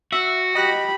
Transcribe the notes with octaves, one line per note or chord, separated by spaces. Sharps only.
F#4 E5
G4 D#5 B5 F#6 A#6